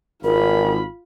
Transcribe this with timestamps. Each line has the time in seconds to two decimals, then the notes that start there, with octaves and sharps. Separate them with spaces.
0.24 G#1 F4 A#4 B5